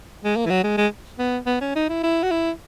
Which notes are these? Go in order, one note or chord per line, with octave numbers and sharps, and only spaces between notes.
G#3
A#3
E3
F#3
G#3
G#3
B3
B3
C#4
D#4
E4
E4
F#4
E4